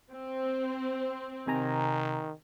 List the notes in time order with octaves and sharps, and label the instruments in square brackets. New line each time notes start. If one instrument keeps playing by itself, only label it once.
[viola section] C4
[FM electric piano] C3 G#5 A#5 [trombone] D#3